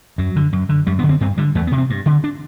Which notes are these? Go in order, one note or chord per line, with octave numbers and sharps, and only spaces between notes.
F#2 F#3
D3
F#2
D3
F#2 G3
B3
D3
C4
G2 C4
D3 G3
E2 A3
B3
C3
C4
G2
D3
D4